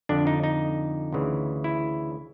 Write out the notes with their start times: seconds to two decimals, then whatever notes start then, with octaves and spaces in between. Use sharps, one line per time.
0.09 F2 D3 D4
0.27 D#4
0.44 D#4
1.13 D2 C#3 E3
1.64 E4